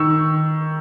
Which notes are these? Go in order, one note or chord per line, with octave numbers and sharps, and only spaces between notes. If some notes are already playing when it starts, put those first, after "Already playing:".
Already playing: D#3 C#6 E6